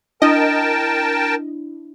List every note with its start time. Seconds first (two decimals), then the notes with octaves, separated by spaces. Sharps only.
0.22 D4 E4 A#4 D#5 G5 A5